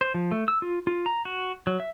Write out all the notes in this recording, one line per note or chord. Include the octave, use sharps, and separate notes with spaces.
C5
F3
A3
E6
F4
F4
A#5
F#4
F#3
E5